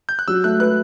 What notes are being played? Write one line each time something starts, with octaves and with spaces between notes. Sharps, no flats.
G6
F#6
F#3 E6
A3 F#6
B4 F#6